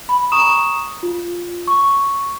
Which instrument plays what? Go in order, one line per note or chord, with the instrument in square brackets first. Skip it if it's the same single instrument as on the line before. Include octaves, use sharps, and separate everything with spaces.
[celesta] B5
A#5 C#6 D#6 E7
F4
C#6